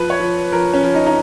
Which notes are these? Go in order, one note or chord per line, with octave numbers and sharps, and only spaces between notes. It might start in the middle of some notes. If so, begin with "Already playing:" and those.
Already playing: F3 B4
C#5
F3
F3 A#4
C#4
F3
D#4
D#4